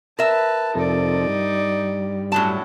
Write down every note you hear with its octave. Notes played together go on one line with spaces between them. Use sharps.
A#4 B4 E5 A5
F2 C3 D#4 A4 D5
G2
A2 F#3 C#4 D4 A5